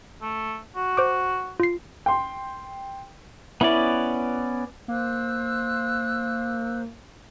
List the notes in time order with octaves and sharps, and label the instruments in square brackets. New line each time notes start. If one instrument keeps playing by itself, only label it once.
[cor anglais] A3
F#4
[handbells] C5 D6
F4 C7
[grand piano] G5 C6
[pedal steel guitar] B3 C#4 D5 [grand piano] E4
[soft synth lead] A#3 [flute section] C5 E6 F#6